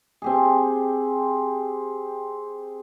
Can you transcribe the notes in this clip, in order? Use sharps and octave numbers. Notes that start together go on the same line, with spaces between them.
C4 G4 G#4